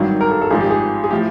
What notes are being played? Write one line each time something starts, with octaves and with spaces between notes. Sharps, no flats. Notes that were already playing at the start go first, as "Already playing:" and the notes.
Already playing: G#1 G2 D#3 F#3
A#4
A4
A4
G#1 G#2 F3 G#4
G4
G#4
G#4
A2 F3 G4